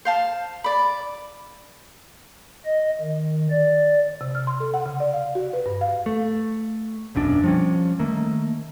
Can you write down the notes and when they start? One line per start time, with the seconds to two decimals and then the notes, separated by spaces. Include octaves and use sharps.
0.05 C5 F5 A5
0.64 D5 B5
2.65 D#5
3.01 D#3
3.51 D5
4.21 C3
4.35 F6
4.47 C6
4.60 A4
4.74 F#5
4.86 C#3
5.00 D5
5.13 F5
5.35 F#4
5.53 B4
5.66 G2
5.81 F5
6.06 A3
7.15 E1 B1 F#2 D4
7.44 F3 G3 C#4
7.99 D#3 A3 A#3